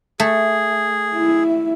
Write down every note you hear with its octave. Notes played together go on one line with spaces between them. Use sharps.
A3 G#4
E4 E5